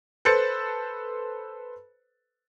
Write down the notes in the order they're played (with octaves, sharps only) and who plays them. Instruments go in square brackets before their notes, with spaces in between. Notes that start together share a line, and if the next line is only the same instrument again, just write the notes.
[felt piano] A4 B4 C5 A6 C#7